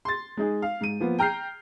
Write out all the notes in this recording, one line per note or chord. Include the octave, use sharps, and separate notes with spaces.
C6 A6
G#3 D#4 G#4
F5
G#2 D#7
F3 A#3 B3
G5 A#5 F6 G6 C7